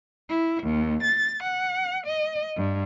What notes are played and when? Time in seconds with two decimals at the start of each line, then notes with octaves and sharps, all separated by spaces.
0.28 E4
0.63 D#2
1.01 A6
1.41 F#5
2.05 D#5
2.55 G2